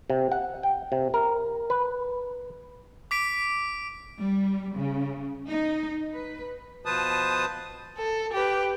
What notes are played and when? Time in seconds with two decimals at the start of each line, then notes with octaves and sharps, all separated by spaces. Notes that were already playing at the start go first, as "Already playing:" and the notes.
0.10 C3
0.32 F#5
0.63 G5
0.92 C3
1.14 A#4
1.70 B4
3.11 D6 B6 D7
4.19 G3
4.76 C#3
5.48 D#4
6.13 B4
6.86 B2 F3 B4 C5 A5 D#6
7.97 A4
8.34 G4 B4